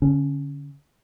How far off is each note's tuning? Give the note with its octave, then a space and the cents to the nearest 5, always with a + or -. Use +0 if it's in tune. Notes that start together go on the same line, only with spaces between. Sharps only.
D3 -25 C#4 +0